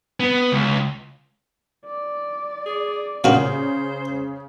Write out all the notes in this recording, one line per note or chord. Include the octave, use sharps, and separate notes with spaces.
B3
C#2
D5
G#4
A#2 C#3 F#4 C5 F5